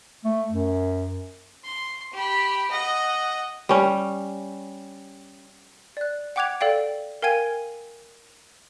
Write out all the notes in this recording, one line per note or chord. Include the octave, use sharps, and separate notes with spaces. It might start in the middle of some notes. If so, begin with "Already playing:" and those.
A3
F#2
C6
G4 B5
D#5 F#5
G3 C#4
D5 F#6
F#5 G5 D6 F#6 G#6 F7
A4 D5 F5 G5
A#4 F5 G5 G#5 G#6 D#7